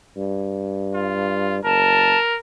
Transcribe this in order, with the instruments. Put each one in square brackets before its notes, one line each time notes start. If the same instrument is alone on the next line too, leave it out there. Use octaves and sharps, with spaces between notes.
[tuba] G2
[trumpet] F4
[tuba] F#1 [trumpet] A#4 [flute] A5